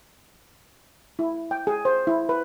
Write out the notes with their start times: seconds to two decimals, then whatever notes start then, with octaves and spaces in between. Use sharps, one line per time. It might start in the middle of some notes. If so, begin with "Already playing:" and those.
1.19 E4
1.51 G5
1.67 G#4
1.85 C5
2.07 E4
2.29 B4